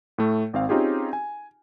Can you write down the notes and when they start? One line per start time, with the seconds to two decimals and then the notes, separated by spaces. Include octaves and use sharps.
0.18 A2 A3
0.53 G#1 C4 F5
0.69 C4 C#4 D#4 F4 G4 G#4
1.13 G#5